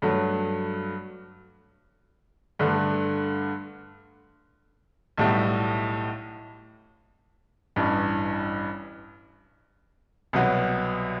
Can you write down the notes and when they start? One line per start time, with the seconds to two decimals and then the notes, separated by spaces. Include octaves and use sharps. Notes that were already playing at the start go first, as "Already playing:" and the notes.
0.02 G2 F#3 A3
2.59 G2 D3 A3
5.18 B1 A2 G3 B3 E4
7.76 A1 G2 E3
10.33 C2 B2 F#3 B3